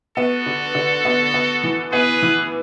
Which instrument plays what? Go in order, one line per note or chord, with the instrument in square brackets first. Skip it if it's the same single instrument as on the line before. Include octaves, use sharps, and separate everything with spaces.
[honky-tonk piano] B3 [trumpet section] F#4 A4
[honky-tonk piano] D3
D3
B3
B3
E3
[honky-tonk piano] B3 [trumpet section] G#4 B4
[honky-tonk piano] E3